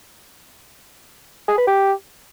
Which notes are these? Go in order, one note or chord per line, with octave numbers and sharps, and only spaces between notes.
G#4
B4
G4